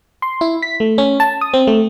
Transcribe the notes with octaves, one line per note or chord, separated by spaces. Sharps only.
C6
E4
B6
A3
C#4
A5
D#6
C4
A3